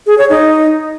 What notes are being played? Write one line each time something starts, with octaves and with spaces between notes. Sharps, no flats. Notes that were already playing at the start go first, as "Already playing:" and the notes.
G#4
C#5
D#4